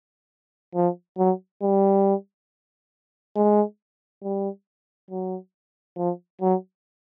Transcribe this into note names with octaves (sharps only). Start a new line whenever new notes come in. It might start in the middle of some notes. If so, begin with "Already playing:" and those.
F3
F#3
G3
G#3
G3
F#3
F3
F#3